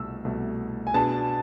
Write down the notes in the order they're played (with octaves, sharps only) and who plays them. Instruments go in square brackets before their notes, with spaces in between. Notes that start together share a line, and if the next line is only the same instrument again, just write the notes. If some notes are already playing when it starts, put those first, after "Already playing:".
Already playing: [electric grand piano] C2 B2 A3 [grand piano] E6
[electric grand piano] C2 B2 A3
[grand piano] G#5
[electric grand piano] B2 B3 D4 G#4 B4 [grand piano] A5